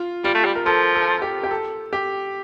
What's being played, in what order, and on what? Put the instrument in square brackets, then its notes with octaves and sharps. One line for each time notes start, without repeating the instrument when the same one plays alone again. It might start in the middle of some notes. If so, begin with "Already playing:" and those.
Already playing: [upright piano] F4
[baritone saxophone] G3 [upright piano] F4
[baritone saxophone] A3
G3
[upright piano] A#4
[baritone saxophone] F3 [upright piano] A4
[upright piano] A4
G4
G4
A4
G4